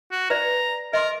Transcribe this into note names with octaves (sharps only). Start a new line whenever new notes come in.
F#4
B4 D5 A#5
A#4 D#5 C6 D6